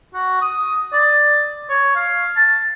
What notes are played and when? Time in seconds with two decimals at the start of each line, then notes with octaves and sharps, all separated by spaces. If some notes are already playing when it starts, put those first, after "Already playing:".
0.14 F#4
0.41 D#6
0.93 D5
1.70 C#5
1.96 F5
2.36 A5